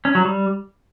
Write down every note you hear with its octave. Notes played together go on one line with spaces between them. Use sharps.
C#4
F#3
G3